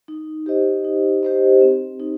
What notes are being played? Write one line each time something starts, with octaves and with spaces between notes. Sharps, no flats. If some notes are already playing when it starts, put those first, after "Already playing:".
D#4
G4 C5 D#5
D#4
G4 C5 D#5
C4
D#4